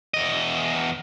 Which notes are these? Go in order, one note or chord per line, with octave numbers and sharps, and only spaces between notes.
E2 D#5